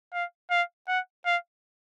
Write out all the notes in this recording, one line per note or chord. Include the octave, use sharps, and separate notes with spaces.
F5
F5
F#5
F5